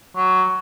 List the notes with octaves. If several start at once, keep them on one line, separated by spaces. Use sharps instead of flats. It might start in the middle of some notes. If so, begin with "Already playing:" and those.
F#3